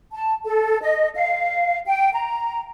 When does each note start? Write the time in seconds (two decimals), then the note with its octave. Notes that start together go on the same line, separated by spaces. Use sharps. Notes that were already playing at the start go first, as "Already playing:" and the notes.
0.12 A5
0.45 A4
0.81 D#5
1.14 F5
1.86 G5
2.13 A#5